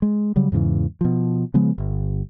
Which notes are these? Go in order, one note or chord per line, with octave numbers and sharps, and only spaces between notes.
G#3
C#3 F#3 G3
E2 G#2 C#3 E3
B2 F3
C#3 F3 G#3 B3
G1